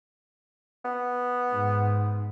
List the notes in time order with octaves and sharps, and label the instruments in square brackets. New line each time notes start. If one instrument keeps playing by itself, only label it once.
[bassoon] B3
[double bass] G#2